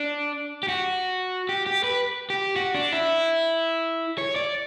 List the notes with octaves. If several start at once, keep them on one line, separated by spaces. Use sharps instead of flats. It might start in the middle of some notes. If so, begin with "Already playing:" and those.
Already playing: D4
G4
F#4
G4
G4
B4
G4
F#4
D4
E4
C#5
D5